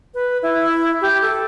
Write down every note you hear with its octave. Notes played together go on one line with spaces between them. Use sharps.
B4
E4
G4
A4